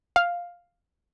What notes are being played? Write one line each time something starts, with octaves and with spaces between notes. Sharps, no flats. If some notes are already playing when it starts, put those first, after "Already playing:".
F5